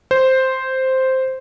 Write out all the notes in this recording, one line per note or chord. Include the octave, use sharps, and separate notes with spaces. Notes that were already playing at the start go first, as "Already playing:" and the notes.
C5